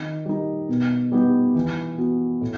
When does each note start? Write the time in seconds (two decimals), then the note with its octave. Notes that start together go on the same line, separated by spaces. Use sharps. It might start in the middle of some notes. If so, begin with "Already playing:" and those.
Already playing: D#3
0.26 G3 D#4
0.69 B2
1.12 G3 B3 D#4 G4
1.55 E3
1.98 B3 F#4
2.41 A2